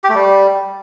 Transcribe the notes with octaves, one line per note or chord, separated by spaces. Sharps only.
G4
A3
G3